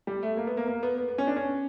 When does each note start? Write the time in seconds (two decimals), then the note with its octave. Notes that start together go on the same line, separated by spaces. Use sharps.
0.07 G3
0.23 A3
0.37 A#3
0.47 B3
0.57 A#3
0.68 A#3
0.83 B3
0.98 B3
1.08 B3
1.18 C#4
1.27 D4
1.37 C#4